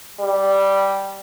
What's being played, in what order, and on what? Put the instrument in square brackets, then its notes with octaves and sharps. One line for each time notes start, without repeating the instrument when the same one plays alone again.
[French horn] G3